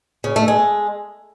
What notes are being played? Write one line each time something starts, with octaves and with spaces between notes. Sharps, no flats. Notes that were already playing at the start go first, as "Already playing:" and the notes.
C#3
A3
G#3